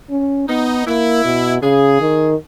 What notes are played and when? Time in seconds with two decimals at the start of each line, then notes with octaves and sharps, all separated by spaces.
0.10 C#4
0.49 B3 D#4
0.86 A#3 E4
1.25 B2
1.63 C#3 G#4
2.01 D#3